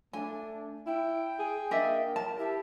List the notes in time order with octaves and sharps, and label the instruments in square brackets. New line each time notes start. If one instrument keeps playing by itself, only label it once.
[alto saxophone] A3 [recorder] D4 [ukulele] G#5
[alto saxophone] E4 [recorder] G5
[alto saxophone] G#4
[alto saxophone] A#3 [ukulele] D4 D#5 E5
[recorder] A#4 [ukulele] A5
[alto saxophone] E4 [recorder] G4